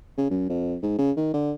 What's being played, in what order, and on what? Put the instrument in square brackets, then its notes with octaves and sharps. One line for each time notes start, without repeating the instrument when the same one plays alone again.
[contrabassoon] C#3
F#2
F2
G#2
C#3
D#3
D3